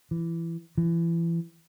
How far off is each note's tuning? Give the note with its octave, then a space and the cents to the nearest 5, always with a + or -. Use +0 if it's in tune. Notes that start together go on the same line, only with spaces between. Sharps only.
E3 +20
E3 +30